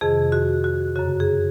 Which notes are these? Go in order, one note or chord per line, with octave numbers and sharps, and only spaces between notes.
F2 C3 D#3 G#4
F#4
F#4
F#2 C#3 F#4
G#4